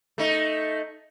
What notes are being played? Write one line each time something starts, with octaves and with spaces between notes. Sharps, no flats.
A3 D#4